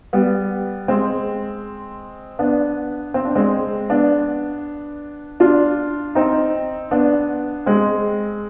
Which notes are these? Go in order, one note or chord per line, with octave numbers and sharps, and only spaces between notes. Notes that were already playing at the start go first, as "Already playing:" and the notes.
G3 B3
G#3 C4
B3 D4
C4
D4
G#3 C4
B3 D4
D4 F4
C4 D#4
B3 D4
G#3 C4